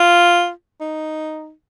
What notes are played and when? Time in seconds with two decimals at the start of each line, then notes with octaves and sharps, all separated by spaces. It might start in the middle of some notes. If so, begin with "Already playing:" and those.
Already playing: F4
0.81 D#4